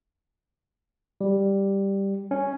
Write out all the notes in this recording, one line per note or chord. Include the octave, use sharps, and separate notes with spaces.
G3
C#4